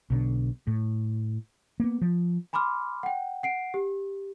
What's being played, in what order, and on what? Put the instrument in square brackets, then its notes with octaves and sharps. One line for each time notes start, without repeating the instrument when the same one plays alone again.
[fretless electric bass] B1 B2 D3
A2
A#3 B3
F3
[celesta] G#5 B5 C6 D6 F6
F#5 G5
F#5 C7 D7
G4